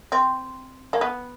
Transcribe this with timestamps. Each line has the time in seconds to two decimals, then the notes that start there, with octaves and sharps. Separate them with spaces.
0.12 C4
0.93 A#3
1.01 B3